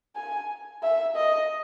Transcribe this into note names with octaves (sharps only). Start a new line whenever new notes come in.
G#5
E5
D#5